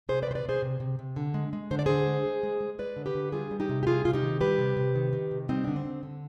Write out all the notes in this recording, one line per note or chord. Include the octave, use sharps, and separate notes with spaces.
C3 G#4 C5
B4 D5
C3 C5
B4 D5
C3 G#4 C5
C3
C3
C3
D3
G#3
G#3
D3 C5
D5
D3 G#4 C5
G#3
G#3
G#3
G#3
G#3 B4 D5
D3
G4 B4
D3
G3 F4 G#4
G3
D#4 G4
C3
G4
G3 F4 G#4
C3 F4
D#4 G4
D#3
G3 G4 B4
C3
C3
D#3
D#3
C3
G3 C4 D#4
D3 D4
C4
D3
D3